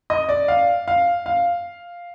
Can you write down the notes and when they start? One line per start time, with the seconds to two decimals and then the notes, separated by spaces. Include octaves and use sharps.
0.10 D#5
0.29 D5
0.48 F5
0.88 F5
1.26 F5